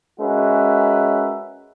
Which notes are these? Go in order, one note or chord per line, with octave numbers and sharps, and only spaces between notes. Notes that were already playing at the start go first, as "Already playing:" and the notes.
G#3 C#4 F#4 A#4 B4 E5